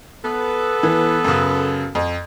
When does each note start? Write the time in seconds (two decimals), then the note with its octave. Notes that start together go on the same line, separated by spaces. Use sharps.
0.25 B3 A4
0.83 E3
1.24 F#2 C#3
1.95 F2